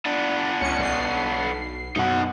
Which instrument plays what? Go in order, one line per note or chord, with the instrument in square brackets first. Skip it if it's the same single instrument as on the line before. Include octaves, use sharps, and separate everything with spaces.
[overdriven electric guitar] B3 D4
[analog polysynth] C#2 C#4 C#7
B1 C7
[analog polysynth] F#2 B2 [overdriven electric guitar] D#4 F#5